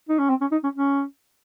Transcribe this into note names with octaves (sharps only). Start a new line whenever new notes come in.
D#4
C#4
C4
C#4
D#4
C#4
C#4